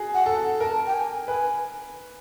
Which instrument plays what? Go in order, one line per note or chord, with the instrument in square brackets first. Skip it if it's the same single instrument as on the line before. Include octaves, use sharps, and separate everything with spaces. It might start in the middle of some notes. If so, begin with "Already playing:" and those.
Already playing: [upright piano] F#4 G#4
[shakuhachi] F#5
[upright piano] A4
[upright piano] A#4 [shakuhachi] A5
[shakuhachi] G5
G#5
[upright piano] B4 [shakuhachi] G#5